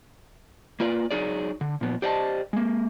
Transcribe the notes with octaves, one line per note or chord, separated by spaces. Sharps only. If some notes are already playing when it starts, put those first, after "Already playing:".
A#3 F4 B4 D5
F#3 D#4 G#4 D5
D3
A#2 F3 B3
G4 C5 D5 D#5 G5 A5
G#3 A#3